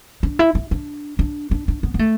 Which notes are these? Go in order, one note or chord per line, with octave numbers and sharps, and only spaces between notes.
D4
E4
E4
D4
D4
D4
D4
B3
B3
A3